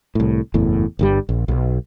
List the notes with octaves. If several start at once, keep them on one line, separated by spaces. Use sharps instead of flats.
C2 A2
F#1 E2 A2
G1 G2 G3
A#1
B1